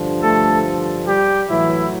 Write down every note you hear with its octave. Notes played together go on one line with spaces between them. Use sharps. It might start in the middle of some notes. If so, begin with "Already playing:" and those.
Already playing: G2 D3 F3
A3 A4
G3 G4
A2 E3 F#3 E4